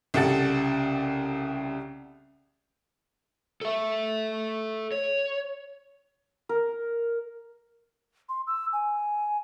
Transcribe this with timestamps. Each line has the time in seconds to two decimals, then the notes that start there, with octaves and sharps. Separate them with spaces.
0.14 C2 C#3 G4 A4 F#5 A6
3.61 A4 E5
4.92 C#5
6.49 A#4
8.29 C6
8.47 E6
8.73 G#5